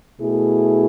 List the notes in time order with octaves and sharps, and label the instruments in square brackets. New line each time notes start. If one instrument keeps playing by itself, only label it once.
[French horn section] B2 A3 E4 G#4